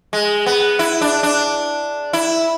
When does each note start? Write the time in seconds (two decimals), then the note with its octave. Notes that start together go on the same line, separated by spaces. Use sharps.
0.13 G#3
0.46 B3
0.79 E4
1.01 D4
1.23 D4
2.13 E4